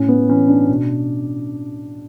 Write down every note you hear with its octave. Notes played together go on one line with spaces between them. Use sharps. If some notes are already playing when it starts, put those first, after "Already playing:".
Already playing: A2 C#4
B3
E3 C#4
D4
B2